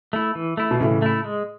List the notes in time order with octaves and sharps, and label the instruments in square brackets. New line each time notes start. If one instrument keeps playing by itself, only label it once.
[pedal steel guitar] A3 E4
E3
A3 E4
[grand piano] B2
[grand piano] A2 C#3 [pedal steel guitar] E3
[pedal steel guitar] A3 E4
G#3